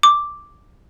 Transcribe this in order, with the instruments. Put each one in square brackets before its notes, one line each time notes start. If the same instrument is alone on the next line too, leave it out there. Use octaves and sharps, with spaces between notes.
[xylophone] D6